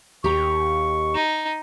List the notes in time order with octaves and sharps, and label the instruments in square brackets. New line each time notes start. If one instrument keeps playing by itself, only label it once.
[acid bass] D#2 [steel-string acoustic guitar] G4 A#5 [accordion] C#6
[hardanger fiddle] D#4